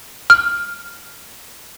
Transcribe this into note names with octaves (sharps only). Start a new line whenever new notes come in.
F6